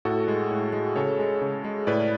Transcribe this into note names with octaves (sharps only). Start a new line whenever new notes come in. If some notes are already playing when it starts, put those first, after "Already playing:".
A2 F#4 A4
G#3
A2
G#3
C#3 A4 C#5
G#3
C#3
G#3
A2 B4 D5